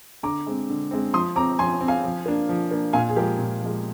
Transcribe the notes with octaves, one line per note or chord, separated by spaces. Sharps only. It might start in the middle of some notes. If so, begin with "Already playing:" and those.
D3 A#5 D6
G#3 C4
D3
G#3 C4
F3 C6 D#6
C4 A#5 D6
F3 G#5 C6
C4
F5 G#5
F3
A#3 D4
F3
A#3 D4
A#2 F5 G#5
G#4
F3 G#3 G4 A#4
A#2
F3 G#3